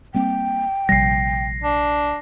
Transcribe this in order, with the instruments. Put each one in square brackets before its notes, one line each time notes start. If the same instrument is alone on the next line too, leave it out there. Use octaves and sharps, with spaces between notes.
[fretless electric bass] G3 A#3 C4 [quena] G5
[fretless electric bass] A#1 C3 G3 [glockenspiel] A#6 C7
[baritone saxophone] D4